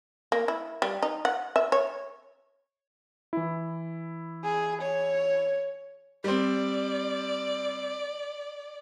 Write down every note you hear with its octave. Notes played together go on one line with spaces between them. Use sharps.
A#3
E4
G3
D#4
F#5
E5
C#5
E3 E4
G#4
C#5
G3 C4 D5